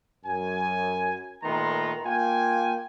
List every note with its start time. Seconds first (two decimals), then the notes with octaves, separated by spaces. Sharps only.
0.26 F#2 G#5
1.43 A#2 D#3 A3 B3 A#5 C6
2.05 A#3 F4 G5 G#5